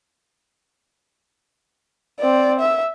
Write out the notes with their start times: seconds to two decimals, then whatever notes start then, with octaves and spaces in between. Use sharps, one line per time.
2.20 C4 D5
2.59 E5